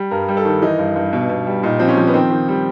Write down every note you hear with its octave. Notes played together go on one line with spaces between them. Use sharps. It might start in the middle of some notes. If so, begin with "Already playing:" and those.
Already playing: G3
G2 A#4
G3
A4
D#3
E3 D#4
G2
G2
B2
B2
G3
A#2 D#4
F3 C4
C#4
F3
B3
D#3 C4
D#3
G3